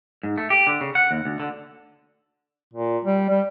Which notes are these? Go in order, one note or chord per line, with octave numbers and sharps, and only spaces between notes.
G#2
A3
G4
D3
C#3
F#5
D#2
D2
D3
A#2
G3
G3